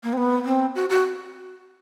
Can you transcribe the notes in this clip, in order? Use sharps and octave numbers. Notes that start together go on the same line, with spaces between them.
A#3
C4
B3
C4
F#4
F#4